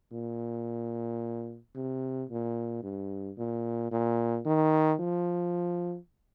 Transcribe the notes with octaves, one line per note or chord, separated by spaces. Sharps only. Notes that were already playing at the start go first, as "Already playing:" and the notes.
A#2
C3
A#2
G2
A#2
A#2
D#3
F3